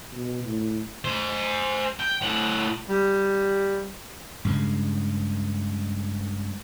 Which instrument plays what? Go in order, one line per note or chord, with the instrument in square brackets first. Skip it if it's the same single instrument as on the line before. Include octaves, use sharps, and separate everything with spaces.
[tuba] B2
A2
[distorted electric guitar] C5 G#5
G5
A2 F#5
[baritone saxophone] G3
[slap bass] G2 C#3 G#3